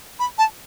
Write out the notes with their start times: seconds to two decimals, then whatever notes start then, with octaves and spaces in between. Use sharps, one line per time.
0.19 B5
0.38 A5